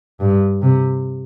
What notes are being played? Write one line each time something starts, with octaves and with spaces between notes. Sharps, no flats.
G2
C3